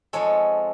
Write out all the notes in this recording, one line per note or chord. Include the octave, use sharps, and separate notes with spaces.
F2 F3 G#3 A4 C#5